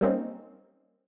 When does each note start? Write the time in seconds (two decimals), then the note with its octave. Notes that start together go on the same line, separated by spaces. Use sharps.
0.01 G3 A#3 C4 C#4 D#4